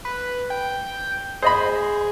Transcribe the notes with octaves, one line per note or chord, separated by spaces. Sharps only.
B4
G5
G#4 C5 D#5 B5